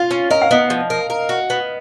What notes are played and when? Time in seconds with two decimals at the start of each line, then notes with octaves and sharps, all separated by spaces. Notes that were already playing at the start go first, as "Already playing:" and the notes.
Already playing: F4 F5
0.11 C#4
0.31 A#4 D#5
0.42 F5
0.51 B3 D#5
0.70 F3
0.90 A#4
1.10 A#4
1.29 F#4
1.50 B3